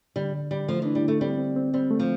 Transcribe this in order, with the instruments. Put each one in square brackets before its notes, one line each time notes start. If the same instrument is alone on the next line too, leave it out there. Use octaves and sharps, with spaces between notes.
[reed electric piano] D3 [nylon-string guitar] G3
[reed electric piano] D3
[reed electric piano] D3 [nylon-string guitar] G3
[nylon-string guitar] F3 [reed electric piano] A3
[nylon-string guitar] E3 [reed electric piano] D4
[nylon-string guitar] G3
[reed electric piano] D3 [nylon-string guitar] A3
[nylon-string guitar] G3 [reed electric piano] C4
[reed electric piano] C4
C4
[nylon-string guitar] G3 [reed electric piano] C4
[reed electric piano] A3
[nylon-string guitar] F3